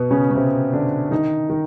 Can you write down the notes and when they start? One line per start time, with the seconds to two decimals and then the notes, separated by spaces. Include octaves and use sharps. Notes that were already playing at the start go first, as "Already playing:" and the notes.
Already playing: B2 B3
0.11 C#3 C#4
0.31 C#4
0.35 C3 C4
0.73 D3 D4
1.11 D#3 D#4
1.50 D#3 D#4